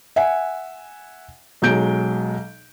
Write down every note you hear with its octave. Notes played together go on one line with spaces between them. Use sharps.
E5 F#5 G#5
B1 F#3 G#3 G6 D7